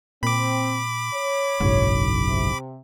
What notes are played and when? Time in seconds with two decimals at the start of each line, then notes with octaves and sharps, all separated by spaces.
0.23 A#2 C4 B5 D6
1.14 C#5
1.60 F#1 B1 G#2
2.25 C3